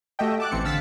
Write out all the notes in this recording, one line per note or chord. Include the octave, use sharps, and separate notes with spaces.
A3 F#4 G4 D#5 E5 G5
A5 D6 F#6
A1 E3 C4 C#7
D3 F5 E6 A6 B6